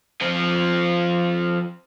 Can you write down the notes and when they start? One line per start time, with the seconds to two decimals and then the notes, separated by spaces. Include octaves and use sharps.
0.21 F3 C4